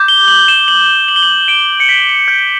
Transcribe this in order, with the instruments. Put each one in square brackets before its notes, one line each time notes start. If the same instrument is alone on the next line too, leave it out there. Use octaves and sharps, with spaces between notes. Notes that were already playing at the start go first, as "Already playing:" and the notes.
Already playing: [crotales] D6 G6
G7
F#7
E7
F#7
F#7
G7
F#7
D7
C#7
B6
G6